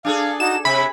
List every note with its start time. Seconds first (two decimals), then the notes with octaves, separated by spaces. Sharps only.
0.05 D4 G#4 A4 F5
0.40 D#4 F#4 D#5 E7
0.65 C3 E5 B5